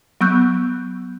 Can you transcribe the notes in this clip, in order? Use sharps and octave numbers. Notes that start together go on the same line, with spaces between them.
F#3 B3 C#6 E6 F#6 G6